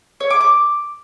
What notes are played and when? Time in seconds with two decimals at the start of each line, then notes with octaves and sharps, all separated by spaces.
0.20 C#5
0.30 D6
0.40 D6